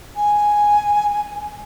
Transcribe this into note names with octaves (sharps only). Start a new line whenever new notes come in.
G#5